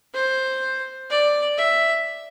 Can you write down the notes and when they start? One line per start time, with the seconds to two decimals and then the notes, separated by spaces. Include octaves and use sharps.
0.14 C5
1.10 D5
1.57 E5